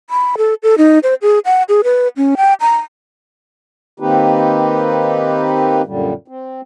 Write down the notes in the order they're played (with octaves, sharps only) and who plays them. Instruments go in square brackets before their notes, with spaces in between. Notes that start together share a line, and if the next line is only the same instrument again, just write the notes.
[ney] B5
A4
A4
D#4
C5
G#4
F#5
G#4
B4
C#4
G5
A#5
[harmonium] D#3 A#3 C4 D#4 G4 B4
F#2 A#2 D3 G3
C4